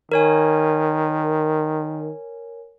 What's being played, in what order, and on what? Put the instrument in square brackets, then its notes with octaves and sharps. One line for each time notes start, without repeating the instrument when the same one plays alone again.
[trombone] D#3 [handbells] A#4 C#5 G#5